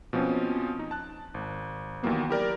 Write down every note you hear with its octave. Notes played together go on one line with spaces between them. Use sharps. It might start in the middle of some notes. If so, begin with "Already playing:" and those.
B2 F3 A#3 C4 C#4
D#4
A5 F#6
G#1
D#2 D#3 E3 F#3 A#3 B3
E4 G4 A#4 D5